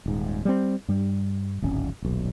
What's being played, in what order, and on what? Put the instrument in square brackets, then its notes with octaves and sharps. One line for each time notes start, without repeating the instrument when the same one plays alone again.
[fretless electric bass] D#1 G#2
G3 G#3 C4
G2 G3
D1 G#1 C#4
D#1 B1